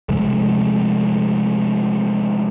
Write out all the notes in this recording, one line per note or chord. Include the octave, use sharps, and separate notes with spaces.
C3 F3 G#3 A3